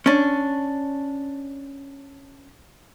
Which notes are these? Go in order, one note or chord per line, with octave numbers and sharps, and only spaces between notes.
C#4 D4